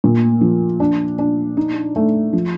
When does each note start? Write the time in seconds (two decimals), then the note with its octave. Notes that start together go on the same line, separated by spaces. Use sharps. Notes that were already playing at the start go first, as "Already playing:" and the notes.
0.04 A#2
0.41 F3
0.80 D4
1.19 D4
1.57 D#4
1.96 A3
2.33 F3